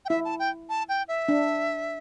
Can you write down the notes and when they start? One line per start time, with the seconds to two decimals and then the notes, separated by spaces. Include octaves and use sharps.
0.05 G5
0.09 E4 E5
0.25 A5
0.39 G5
0.69 A5
0.89 G5
1.08 E5
1.28 D4